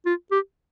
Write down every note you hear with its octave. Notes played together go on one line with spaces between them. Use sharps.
F4
G4